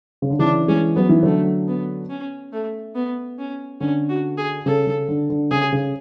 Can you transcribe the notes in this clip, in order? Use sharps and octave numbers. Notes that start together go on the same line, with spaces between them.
C#3
D3
C#3 E3 D4
E3 G#3 C#4
F#3 B3
E3
D3 F#3 A3
B3
C#4
A3
B3
C#4
D3 C#4
F#4
G#4
C#3 A4
C#3
D3
D3
C#3 G#4
C#3